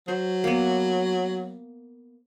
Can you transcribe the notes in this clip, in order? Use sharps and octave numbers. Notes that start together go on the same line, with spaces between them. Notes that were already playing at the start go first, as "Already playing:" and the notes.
F#3 C5
A#3 B3